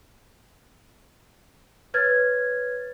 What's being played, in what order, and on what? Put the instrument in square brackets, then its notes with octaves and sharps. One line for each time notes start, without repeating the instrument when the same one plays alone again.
[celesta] B4 C#5 F6 G#6 A6